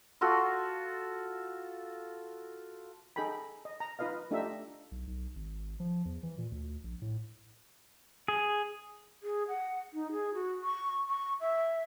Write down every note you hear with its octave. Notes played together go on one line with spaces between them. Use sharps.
F4 F#4 A4
D#4 G#4 A4 G5 B5
D#5
A#5
D#4 F4 B4 D#5 F5
A3 D4 D#4 F4 G4 E5
B1
B1
G#1
F3
E2
E3
A#2
D2
A#1
A2
G#4
G#4
F#5
D#4
G#4
F#4
C#6
C#6
E5